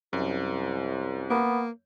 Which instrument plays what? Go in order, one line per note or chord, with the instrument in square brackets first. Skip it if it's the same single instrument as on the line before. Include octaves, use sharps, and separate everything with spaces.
[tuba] C2 [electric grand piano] F#2
[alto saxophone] A#3 [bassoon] B3